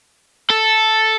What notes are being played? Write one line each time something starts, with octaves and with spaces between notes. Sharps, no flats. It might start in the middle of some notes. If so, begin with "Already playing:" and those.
A4